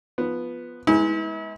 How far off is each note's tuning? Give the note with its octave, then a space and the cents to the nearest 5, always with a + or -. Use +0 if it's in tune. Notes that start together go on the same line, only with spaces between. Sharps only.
F3 +0 B3 +0
G#3 +5 B3 -15 E4 -40